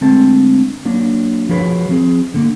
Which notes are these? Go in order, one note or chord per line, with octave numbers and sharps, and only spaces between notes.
D3 G#3 A3 C4 A5
F#3 A#3 D4
F3 F#4 G#4 A#4 B4 C#5
F3 C4 G#4
D3 A#3